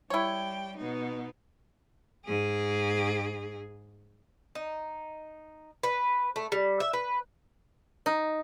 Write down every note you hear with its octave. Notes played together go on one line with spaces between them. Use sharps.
G3 E4 C#5 G5
B2 D#4
G#2 G#4
D#4
B4
A3
G3
E5
B4
D#4